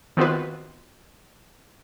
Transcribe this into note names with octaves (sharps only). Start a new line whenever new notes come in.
D#3 B3 C4 F4 F#4 B4